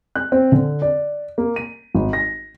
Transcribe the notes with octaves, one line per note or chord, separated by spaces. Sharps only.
F#6
C4
D3
D5
A#3
D#7
G#1
A#6